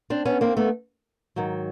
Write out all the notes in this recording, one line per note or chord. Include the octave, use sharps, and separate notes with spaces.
C4 D4
B3 C#4
A#3 C4
A3 B3
G#2 D#3 F#3